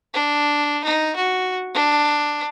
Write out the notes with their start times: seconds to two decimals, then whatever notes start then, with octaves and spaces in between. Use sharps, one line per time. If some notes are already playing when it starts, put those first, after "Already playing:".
0.14 D4
0.84 D#4
1.16 F#4
1.75 D4